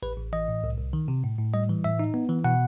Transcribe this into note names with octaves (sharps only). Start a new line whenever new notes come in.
A1 B4
A1
E3 D#5
A2
C2
C2
D#3
C3
A2
A2
G3 D#5
E3
A2 E5
D#4
B3
E3
B2 F#5